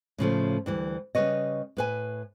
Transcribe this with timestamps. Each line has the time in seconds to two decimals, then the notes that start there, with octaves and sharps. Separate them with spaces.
0.18 A2 C#3 F3 A3
0.66 D2 E3 G3
1.15 C#3 G3 B4 C#5 D#5
1.77 A2 B4 G#5